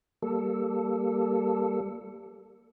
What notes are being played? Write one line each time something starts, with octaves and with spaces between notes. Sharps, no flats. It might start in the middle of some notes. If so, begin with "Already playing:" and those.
G3 A#3 A4